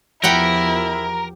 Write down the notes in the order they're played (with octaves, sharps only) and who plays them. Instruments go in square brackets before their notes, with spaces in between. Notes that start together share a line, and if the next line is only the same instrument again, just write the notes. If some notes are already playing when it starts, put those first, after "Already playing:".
[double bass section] E2 F3 [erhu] E4 [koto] G4 F#5 G5 [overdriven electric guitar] A#4